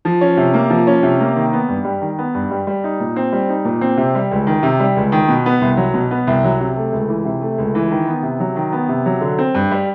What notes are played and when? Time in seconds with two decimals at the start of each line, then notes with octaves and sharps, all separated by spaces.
0.05 F3
0.21 C#4
0.37 C3
0.54 A#3
0.70 F3
0.87 C#4
1.03 C3
1.20 A#3
1.36 D#3
1.53 B3
1.69 G2
1.85 G3
2.01 D#3
2.18 B3
2.35 G2
2.51 G3
2.67 G3
2.84 D#4
3.00 A#2
3.16 C4
3.32 G3
3.49 D#4
3.65 A#2
3.81 C4
3.97 C3
4.15 G3
4.31 C#2
4.47 D#3
4.63 C3
4.80 G3
4.96 C#2
5.12 D#3
5.29 B2
5.46 B3
5.61 C2
5.77 F#3
5.94 B2
6.11 B3
6.27 C2
6.44 F#3
6.60 C3
6.76 A3
6.92 C#2
7.09 E3
7.25 C3
7.41 A3
7.58 C#2
7.75 E3
7.91 D#3
8.07 B3
8.23 C3
8.40 F#3
8.56 D#3
8.72 B3
8.89 C3
9.06 F#3
9.21 D3
9.38 C4
9.55 G2
9.71 G3